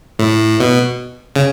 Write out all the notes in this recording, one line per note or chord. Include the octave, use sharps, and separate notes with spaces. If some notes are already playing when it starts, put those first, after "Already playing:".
A2
B2
C#3